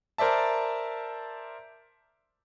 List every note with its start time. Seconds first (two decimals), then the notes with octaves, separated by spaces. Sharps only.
0.18 A#4 C5 D5 E5 A5